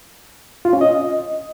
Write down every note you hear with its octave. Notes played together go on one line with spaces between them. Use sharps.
F4
C#4
D#5